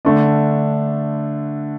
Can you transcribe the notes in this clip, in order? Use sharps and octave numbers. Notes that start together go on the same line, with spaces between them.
D3 A3 D4